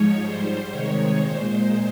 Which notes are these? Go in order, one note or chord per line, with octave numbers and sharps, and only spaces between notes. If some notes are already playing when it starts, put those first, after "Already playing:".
Already playing: G#2 F3 G#3 C#5
G#2 G3 C5
C3 D#3 G#3 C#5
A#2 G#3 C5